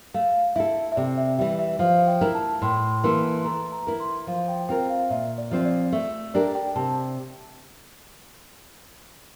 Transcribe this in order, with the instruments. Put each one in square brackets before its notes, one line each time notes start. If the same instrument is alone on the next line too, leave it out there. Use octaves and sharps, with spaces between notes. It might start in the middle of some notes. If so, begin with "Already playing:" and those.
[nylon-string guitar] A3 [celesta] F5
[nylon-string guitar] E4 A4 [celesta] E5
[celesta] E5
[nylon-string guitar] C3 [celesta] D5
[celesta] E5
[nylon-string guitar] E3 G3 [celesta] E5
[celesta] E5
[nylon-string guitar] F3 [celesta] F5
[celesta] G5
[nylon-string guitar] A3 E4 A#4
[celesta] A5
[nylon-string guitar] A2 [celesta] C6
[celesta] C6
C6
[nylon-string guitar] E3 A#3 E4 A4 [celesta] C6
[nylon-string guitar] A3 [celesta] A#5
[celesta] A#5
[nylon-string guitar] E4 A#4
[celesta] C6
[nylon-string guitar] F3 [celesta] F5
[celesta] G5
[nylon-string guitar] C4 F4 A#4 [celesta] G5
[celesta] F5
[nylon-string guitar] A#2 [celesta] E5
[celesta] D5
[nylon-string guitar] F3 C4 F4 C5
[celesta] D5
[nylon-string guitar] A3 [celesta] E5
[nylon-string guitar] D4 G4 A#4 [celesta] D5
[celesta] G5
[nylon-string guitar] C3 [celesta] A5